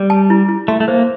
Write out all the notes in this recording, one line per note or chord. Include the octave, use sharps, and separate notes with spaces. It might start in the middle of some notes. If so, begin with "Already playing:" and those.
Already playing: G3
A5
E4
E4
A3 C6
A3
A#3 C5